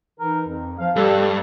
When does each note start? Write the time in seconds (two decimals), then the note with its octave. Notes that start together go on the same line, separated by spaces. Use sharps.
0.20 E3 D#4 A#4
0.47 F2
0.78 F3 F5
0.96 G2 G4 A4